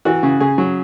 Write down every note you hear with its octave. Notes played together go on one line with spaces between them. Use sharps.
E3 F#4
C#3
C#3 G#4
F#3